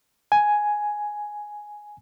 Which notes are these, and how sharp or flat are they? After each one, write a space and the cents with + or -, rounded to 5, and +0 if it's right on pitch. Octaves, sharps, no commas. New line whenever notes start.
G#5 +5